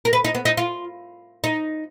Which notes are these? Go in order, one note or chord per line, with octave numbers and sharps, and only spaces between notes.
A#4
B4
D#4
B3
D#4
F4
D#4